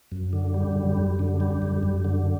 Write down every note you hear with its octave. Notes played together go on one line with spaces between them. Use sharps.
F#2
D3
G3
F#2
F#2
D3
G3
F#2
F#2
D3